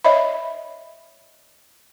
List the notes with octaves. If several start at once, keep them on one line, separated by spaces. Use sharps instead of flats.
C#5 D#5 E5 B5